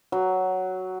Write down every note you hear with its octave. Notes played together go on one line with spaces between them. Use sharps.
F#3